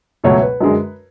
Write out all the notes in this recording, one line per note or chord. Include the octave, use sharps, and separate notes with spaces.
C#2 B2 F#3 A3 C#5
B4
F#2 D3 G#3